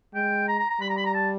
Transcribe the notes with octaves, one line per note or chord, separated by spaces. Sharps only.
G#3 G5
A#5
A#5
A#5
G3 B5
A#5
B5
A#5
A5